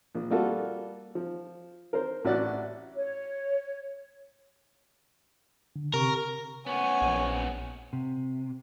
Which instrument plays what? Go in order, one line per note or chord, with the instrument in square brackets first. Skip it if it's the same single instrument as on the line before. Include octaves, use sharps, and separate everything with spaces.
[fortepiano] A#1
G3 A#3 F4 F#4 A4
F3
A#4 C5
A1 F#4 D5 F#5 F#6
[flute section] C#5
[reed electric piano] D3
[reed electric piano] C3 G4 C#6 [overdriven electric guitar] A#4
[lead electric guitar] B3 C#4 [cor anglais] C#5 [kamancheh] F#5 G#5
[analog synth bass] A#1
[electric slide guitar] C3